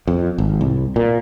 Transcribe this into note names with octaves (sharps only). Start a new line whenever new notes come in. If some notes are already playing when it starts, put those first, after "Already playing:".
F2
G#1
C2
A#2